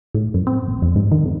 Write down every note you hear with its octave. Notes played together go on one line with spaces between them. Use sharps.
A2
F#2
C4
A#1
F2
G#2
D#3
F2